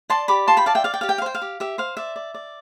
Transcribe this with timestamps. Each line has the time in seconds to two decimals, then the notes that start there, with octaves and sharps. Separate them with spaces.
0.10 D5 A5 C6
0.28 G4 B5 D6
0.48 F4 A5 C6
0.57 G5 B5
0.66 D5 F5 A5
0.75 E5 G5
0.84 D5 F5
0.94 G5
1.01 G4 F5
1.09 G5
1.18 F5
1.22 C5 G5
1.35 F5
1.42 G4
1.60 G4 E5
1.78 C5 F5
1.97 D5 E5
2.16 D5
2.34 D5